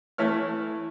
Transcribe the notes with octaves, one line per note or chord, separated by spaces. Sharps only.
E3 A3 E4 C#5 F6